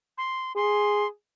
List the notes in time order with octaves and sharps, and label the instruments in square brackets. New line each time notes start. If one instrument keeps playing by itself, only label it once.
[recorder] C6
[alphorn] G#4 [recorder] C6